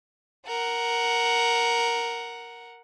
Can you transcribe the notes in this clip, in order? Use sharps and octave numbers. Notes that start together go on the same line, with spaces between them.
A#4 F#5